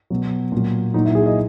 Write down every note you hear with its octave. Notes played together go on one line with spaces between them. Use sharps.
B2 F#3
A#2 F#3
A#2 F#3 D#4
E4
G#4
D#5